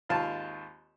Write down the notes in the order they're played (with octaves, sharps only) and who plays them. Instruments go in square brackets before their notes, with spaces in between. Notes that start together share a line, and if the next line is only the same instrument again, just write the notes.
[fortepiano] G#1 D#2 F4 F5 A5